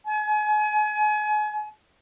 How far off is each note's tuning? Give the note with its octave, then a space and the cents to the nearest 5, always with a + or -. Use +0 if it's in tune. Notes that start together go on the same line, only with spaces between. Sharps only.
G#5 +35